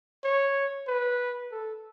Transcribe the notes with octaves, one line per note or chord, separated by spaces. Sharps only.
C#5
B4
A4